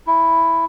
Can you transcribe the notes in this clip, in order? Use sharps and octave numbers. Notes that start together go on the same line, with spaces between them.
E4